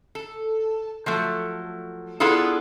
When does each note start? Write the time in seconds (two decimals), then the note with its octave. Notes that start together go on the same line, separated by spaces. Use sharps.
0.15 A4
1.06 F3 F#3 A3
2.20 B3 D4 E4 F4 G#4 A4